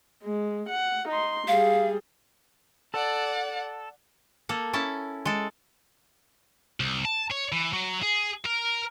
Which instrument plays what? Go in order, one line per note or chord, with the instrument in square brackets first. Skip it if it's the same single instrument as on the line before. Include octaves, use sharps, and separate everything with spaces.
[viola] G#3
F#5
D#4 C6
[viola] G3 G#4 [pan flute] F5
[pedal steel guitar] A4 [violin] D5 F#5
[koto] A#3 A4
C#4 E4 A5
G#3 A4
[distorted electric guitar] C2
A5
C#5
E3
F#3
G#4
A#4